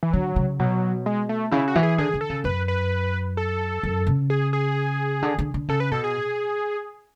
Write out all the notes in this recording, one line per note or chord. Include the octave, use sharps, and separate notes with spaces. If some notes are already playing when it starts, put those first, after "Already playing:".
E3
D3 F#3
C#3
B2 F#3
G#3
A3
C#3 E4
F#4
E3
G#4
D3 G#4
D3
A4
C#3
F#2 B4
B4
A4
F#2
C#3
G#4
G#4
D3
D3
D3
C#3 A4
B4
B2 A4
G#4